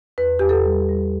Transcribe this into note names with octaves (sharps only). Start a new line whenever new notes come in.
E2 B4
E2 G4
A4
G3
G3